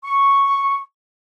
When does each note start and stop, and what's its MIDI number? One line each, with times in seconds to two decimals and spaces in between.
0.05 0.81 85